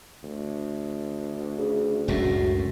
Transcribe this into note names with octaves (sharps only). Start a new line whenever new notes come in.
D2
C#3
F#1 C#2 F#2 A2